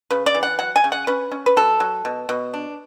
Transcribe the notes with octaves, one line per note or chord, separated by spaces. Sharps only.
C#3 B4
D5
E3
F#5
F#3 F#5
G#5
C#3
F#5
C#4 B4
C#4
B4
F#3 A4
F#3
B2
B2
D4